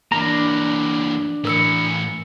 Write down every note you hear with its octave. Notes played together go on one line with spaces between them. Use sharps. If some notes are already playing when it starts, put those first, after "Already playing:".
E3 A#3 D4 A#5
A2 E3 A#4 E6 C#7